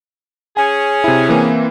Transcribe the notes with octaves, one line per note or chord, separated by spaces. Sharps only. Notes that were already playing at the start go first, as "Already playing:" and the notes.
C#4 G#4 G#5
C3 E4
E3 A#3 C4